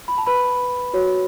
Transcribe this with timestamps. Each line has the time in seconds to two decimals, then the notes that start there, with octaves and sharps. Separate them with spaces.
0.08 B5
0.18 A5
0.27 B4 B5
0.94 F#4 C#5